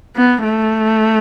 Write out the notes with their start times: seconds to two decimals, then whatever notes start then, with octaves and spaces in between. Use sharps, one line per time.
0.16 B3
0.44 A3